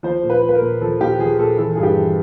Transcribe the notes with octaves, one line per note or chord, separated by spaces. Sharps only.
F3 C5
A#2
B4
F3
B4
A#4
A#2
F3 A4
A#2 G4
F3 G#4
A#2 A4
E3 A4
G2 G#4
G4
E3